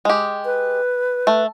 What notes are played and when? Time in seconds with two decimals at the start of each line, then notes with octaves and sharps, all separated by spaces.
0.05 G#3 G4
0.45 B4
1.27 A3